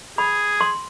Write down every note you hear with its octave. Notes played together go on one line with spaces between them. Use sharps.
G#4 B5
C6